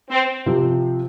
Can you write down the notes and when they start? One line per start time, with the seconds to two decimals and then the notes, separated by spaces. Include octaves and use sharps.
0.10 C4
0.46 C3 F3 C4 G4